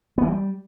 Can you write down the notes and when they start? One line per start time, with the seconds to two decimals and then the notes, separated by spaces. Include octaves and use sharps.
0.18 B3
0.23 E3
0.28 G3